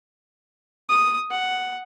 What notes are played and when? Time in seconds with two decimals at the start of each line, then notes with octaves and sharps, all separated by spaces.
0.89 D#6
1.31 F#5